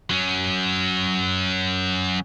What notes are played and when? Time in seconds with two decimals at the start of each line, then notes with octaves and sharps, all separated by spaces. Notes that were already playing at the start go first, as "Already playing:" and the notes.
0.10 F#3 C#4